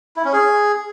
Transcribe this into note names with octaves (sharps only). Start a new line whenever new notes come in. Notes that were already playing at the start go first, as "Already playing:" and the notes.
E4
C#4
G#4